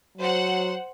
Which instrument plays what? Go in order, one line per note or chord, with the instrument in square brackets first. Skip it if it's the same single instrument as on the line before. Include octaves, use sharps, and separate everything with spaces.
[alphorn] F#3 [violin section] C5 F#5